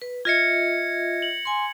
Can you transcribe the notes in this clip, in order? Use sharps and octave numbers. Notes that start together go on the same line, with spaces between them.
B4
F4 D#5 E5 G#6 A#6 C#7
F#7
G#5 C6